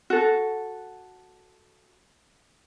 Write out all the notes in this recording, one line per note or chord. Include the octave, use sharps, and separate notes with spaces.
F#4 A4